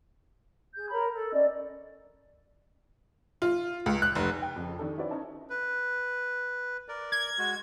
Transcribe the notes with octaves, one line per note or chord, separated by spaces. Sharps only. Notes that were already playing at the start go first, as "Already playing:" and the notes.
G#4 G6
A#4 C#5 A#5 B5
A4
C#4 D5 D#5
F4
C#2
F#6
F1
G5
F2 C#3
D#3 D4 G4 A4
C#4 E4 F#4 B4 D5
C#4 D#4 C#5 D#5 E5 A5
B4
A#4 D5
G#6
G#3 F#4